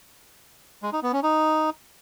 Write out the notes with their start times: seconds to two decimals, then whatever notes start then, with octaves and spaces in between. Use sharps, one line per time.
0.83 G#3
0.93 D#4
1.03 B3
1.13 C#4
1.23 D#4